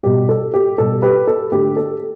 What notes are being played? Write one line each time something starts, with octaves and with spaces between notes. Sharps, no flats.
B2 G3 G4
A4
G4
B2 G3 A4
G4 B4
A4
D3 A3 G4
A4